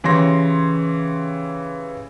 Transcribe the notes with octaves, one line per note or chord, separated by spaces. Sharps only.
C#3 E3 G4 C#5 C6 A#6